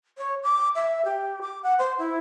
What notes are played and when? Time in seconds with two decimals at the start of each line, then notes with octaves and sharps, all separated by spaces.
0.18 C#5
0.43 D6
0.75 E5
1.05 G4
1.42 D6
1.63 F#5
1.79 C5
1.98 E4